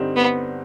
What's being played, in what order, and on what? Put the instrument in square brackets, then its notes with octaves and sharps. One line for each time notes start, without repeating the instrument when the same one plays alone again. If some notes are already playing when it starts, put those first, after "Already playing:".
Already playing: [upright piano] G2 D3 G3 C4 D#4
[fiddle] B3